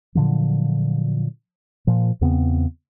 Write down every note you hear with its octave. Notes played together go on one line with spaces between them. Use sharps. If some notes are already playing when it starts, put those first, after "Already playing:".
A#2 D3 F3 F#3
A#2 F3
E2 C#3 B3 C4